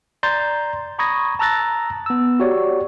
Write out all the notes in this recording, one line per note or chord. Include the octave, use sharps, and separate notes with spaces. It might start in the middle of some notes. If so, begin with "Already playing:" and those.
D5 A#5 C6 G6 A6
A#5 B5 C#6 D#6 G#6 A#6
A5 A#5 E6 F#6 A6 A#6
B3 E6
F#4 G4 C#5 D5